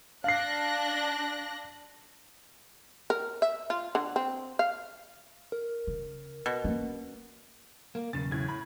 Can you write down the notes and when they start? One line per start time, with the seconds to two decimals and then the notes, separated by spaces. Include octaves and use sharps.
0.24 D4 F5 F#6 A#6 C7
3.10 A#4
3.42 E5
3.70 F4
3.95 D3
4.16 C4
4.59 F5
5.52 A#4
5.87 C#3
6.46 B2
6.64 A#3 C#4
7.95 A#3
8.13 B1 E2 C#3 A6
8.31 A2 G#6
8.49 B5